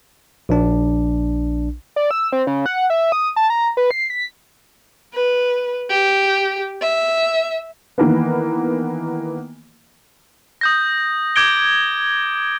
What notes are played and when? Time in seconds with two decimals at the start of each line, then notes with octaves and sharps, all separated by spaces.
0.49 A#1 D4
1.96 D5
2.11 E6
2.32 C4
2.47 C#3
2.66 F#5
2.90 E5
3.12 D#6
3.36 A5
3.50 A#5
3.77 B4
3.91 C7
4.10 B6
5.14 B4
5.90 G4
6.82 E5
7.98 D#3 E3 A#3 B3
10.61 D#6 G6 A#6
11.36 D6 G6 G#6 D7 G7